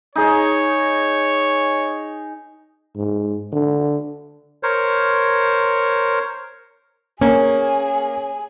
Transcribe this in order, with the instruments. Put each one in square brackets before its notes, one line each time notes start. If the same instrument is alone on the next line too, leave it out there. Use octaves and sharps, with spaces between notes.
[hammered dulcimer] D#4 G#4 D#5 [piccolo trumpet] C#5
[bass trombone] G#2
D3
[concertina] A#4 C5 C#5
[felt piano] A#3 [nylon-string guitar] C#4 [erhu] G#4